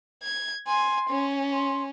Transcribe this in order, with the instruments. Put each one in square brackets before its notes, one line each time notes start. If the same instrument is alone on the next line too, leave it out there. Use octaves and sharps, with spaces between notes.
[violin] G#6
[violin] G#5 [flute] C6
[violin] C#4
[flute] C6